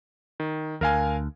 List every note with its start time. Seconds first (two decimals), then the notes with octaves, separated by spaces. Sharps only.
0.40 D#3
0.81 D2 A#4 F5 G#5